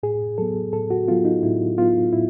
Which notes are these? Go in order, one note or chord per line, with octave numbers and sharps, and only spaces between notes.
A2 G#4
F#3 B3 A4
A2 A4
F#4
F#3 B3 F4
D#4
A2 E4
F#3 B3 F4
A2 E4